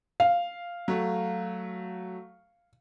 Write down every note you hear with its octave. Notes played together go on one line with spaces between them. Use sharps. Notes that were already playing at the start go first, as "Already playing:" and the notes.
F5
F#3 A3